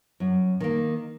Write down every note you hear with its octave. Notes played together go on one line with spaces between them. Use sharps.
F#2
D#3 A#3